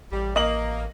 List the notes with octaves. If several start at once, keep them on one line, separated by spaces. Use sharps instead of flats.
A1 G3
A#3 D#5 F#7